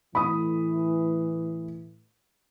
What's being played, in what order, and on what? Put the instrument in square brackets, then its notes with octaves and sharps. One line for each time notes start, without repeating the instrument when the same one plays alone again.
[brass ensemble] A2 E3 [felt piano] B5 D#6